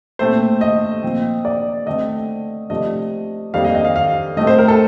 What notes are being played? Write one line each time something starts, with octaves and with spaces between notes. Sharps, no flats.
A#2 A3 C4 C5
D#5
A#2 F3 C4
D5
D3 A3 C4 D#5
C3 F3 A3 D4 D#5
F2 D#3 G3 A#3 D4 F5
D#5
D#5
F5
F5
A2 A3 C4 D#5
C5
A#4
A4